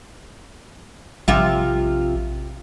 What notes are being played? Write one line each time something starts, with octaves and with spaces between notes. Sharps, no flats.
A#1 C3 F4 E5